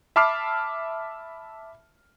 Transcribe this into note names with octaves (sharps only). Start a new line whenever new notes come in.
E5 A5 B5 D6 F6 C7